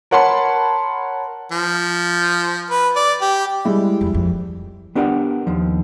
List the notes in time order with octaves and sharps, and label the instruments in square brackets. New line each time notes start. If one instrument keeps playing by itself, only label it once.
[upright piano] A#4 C#5 F#5 A5 B5 C6
[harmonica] F3
B4
D5
G4
[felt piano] G3 G#3 E4
[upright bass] F2
F2
[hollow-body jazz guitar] B3 D4 G4 A#4 E5 F#5
D#2 F3